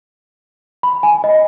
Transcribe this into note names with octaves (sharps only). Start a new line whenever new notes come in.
B5
G#5
D#5